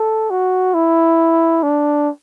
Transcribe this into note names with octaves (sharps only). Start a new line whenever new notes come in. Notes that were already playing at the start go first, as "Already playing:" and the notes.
Already playing: A4
F#4
E4
D4